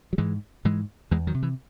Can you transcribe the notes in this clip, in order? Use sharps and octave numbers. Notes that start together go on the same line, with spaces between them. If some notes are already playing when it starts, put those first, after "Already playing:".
F#3
G#2 E3 G#3
G#2 E3 G#3
E2 E3 G#3
D#3 F#3
C3
E3